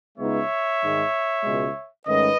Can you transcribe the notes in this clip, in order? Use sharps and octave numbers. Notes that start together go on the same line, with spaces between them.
C#2 C#3 G#3 B3 D#4 C#5 E5
G#2 D#3 G#3
C#2 B2 G#3
G#2 D#3 A3 C#4 B4 D#5